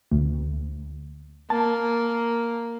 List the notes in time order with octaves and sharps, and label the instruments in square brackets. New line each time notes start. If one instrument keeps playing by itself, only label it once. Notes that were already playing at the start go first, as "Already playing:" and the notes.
[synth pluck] D2
[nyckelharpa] A#3 [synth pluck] A5